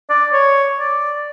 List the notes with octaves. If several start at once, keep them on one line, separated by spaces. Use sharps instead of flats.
D5
C#5
D5